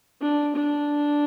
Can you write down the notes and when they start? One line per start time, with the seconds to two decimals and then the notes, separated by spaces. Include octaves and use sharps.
0.21 D4
0.56 D4